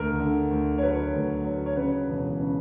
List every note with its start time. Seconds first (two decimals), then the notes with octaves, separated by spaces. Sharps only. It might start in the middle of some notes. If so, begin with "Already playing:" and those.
Already playing: D2 A#4
0.19 D3
0.51 D2
0.78 C#5
0.82 F#3 B4
1.14 D2
1.45 F#3
1.66 C#5
1.76 C#3 B4
2.08 E1
2.40 C#3